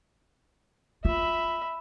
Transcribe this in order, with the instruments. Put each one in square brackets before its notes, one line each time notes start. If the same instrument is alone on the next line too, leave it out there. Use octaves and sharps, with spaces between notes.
[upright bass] F4 [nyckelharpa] E5 B5